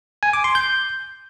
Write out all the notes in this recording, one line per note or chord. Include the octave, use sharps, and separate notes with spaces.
G#5
D6
C6
G6